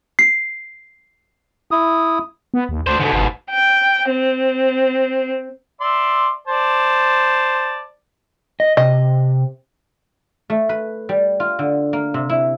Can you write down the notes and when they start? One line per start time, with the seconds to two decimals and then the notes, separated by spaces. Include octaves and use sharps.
0.19 C7
1.71 E4 D#6
2.54 B3
2.69 D#2
2.87 D2 D4 C5
3.00 G#2 B2 D3
3.13 G1
3.50 G5
4.09 C4
5.81 D5 E5 C6
6.47 C5 D5 A5
8.60 D#5
8.77 C3 D#5
10.50 A3
10.69 B4
11.09 G3
11.40 F4
11.59 D3
11.93 A#3
12.14 C3
12.29 E4